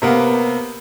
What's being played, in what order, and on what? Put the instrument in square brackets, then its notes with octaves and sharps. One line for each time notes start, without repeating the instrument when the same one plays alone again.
[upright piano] C3 A#3 B3